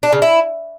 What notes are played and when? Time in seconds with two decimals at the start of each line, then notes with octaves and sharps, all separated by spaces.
0.03 D4
0.12 C#3
0.22 E4